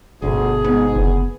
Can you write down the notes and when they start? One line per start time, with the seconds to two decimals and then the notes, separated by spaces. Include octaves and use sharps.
0.22 G1 D2 B2 D3 G#4
0.65 G#2 B3
0.96 F#1 B3